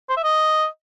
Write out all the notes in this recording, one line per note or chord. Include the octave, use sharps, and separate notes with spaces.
C5
E5
D#5